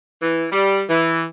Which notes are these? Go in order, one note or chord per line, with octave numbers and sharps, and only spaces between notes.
E3
G3
E3